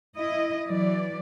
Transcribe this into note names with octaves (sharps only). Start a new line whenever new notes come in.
E4 D#5
E3 F#3 D5